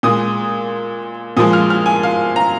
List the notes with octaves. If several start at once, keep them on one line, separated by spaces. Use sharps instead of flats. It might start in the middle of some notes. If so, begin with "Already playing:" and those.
A#2 G#3 D#6
A#2 F3 G#3 D#6
F6
F6
G#5
F5
A#5